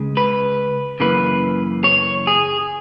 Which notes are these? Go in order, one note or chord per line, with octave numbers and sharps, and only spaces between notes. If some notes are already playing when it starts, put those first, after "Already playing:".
Already playing: C#2 C#3 G#3
B4
F#2 C#3 E3 A#3 B4
C#5
G#4